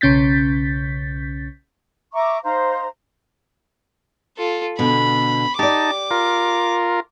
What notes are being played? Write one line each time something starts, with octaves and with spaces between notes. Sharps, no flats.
B1 C#3 C#4 G6 A6 B6
E5 A#5 C#6 D6
D#4 C5 F5 A#5
F4 A4
B2 D3 B5
D#4 G4 D5 A5 D6
F4 A#4